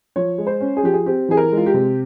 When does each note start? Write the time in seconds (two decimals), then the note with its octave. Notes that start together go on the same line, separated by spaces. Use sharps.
0.16 F3 C#5
0.38 G#3
0.47 C5
0.61 C#4
0.77 G#4
0.83 F3 G4
0.93 G#4
1.06 C4 G4
1.29 E3 G#4
1.37 A#4
1.52 G#3
1.57 F4
1.66 G4
1.74 C3